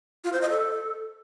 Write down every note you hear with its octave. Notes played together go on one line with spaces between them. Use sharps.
F4
C5
D#5
A4